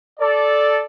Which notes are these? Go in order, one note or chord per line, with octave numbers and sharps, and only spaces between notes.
A4 D5